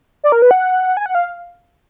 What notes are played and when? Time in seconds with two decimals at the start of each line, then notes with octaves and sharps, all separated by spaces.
0.24 D5
0.32 A#4
0.42 B4
0.51 F#5
0.97 G#5
1.06 F#5
1.15 F5